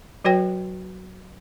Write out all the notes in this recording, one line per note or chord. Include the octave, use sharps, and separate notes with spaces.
F#3 F#4 B4 C#5 G5